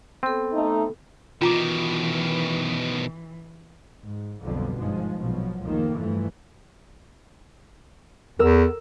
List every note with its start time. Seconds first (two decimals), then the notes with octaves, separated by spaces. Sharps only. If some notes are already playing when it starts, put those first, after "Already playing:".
0.23 B3 C4 A4
0.53 A3 D#4
1.41 B2 D#3 E3 F4 A#5 D6
4.03 G#2
4.43 B1 F2 B2 D3 F3 G3
4.77 G#1 G2 D#3 F3 G#3
5.16 A#1 B2 F3 F#3
5.64 F1 C#2 D#3 F3 A#3
5.97 G2 E3 F3 A3
8.39 E2 A#4 E6